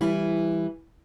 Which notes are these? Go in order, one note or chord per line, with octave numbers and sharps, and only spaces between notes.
E3 G3 E4